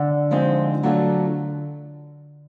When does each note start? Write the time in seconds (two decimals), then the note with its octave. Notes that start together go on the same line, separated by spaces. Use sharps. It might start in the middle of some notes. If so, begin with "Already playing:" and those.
Already playing: D3
0.31 F3 G#3 C4 D#4 G4
0.83 F#3 A3 D4 F4 A4